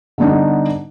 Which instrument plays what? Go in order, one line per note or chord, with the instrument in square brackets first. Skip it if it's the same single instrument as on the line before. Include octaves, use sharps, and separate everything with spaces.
[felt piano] D3 G3 B3 D4 D#4